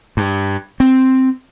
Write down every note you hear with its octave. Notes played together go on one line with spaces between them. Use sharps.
G2
C4